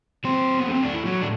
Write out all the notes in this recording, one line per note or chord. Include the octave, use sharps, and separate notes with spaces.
F#3 C4 C5
B3
A3
C4
D4
E4
A2 F#3 F#4
D4